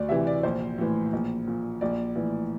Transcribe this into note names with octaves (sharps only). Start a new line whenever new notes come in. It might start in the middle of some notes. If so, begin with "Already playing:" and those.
Already playing: D2 D5
C3 E3 E5
D5
A#1 C5
A2 E3
A#1
A#2
A#1 D5
A2 E3